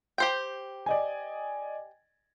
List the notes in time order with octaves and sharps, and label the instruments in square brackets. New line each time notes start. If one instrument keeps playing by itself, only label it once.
[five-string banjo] G4 C5 G5
[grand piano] D5 D#5 G#5